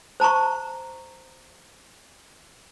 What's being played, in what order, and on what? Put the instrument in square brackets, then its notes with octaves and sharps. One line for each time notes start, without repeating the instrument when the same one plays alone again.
[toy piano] C5 A5 A#5 C#6